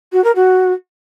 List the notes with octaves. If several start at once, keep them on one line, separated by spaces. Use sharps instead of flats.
F#4
A#4
F#4